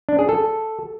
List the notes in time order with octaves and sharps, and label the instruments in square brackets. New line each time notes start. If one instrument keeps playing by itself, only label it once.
[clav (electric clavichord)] D4
G#4
A4